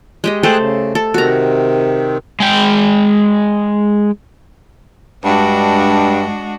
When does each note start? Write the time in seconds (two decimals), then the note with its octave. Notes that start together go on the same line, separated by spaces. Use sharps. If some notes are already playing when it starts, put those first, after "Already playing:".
0.24 G#3 G4 D#5
0.43 A3 G#4 A4 C5 G5 F#6
0.60 C#3
0.95 A4
1.14 C3 D#3 F#4 A#5
2.40 G#3 G5
5.24 G2 G#3 D4 F#4